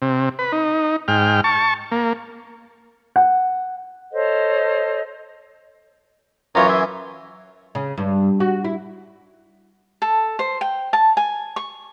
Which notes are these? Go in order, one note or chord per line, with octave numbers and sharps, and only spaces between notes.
C3
B4
D#4
G#2 G5 F6
A5 C#6
A#3
F#5
A4 C5 C#5 D#5
F#2 E3 F4 C#5 A#5
E5 G#5 C6
C#3
G2
F#4
E4
A4
C5
G5
A5
G#5
C#6